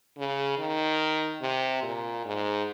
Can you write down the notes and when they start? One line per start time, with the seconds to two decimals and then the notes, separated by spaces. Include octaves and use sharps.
0.18 C#3
0.59 D#3
1.41 C3
1.83 A#2
2.25 G#2